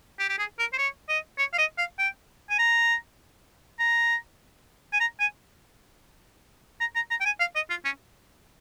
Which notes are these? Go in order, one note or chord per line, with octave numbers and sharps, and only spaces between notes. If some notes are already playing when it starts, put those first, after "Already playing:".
G4
G4
G#4
A#4
C5
C#5
D#5
C#5
F5
D#5
F5
G5
G#5
A#5
A#5
G#5
A#5
G#5
A#5
A#5
A#5
G5
G#5
F5
D#5
F4
C#4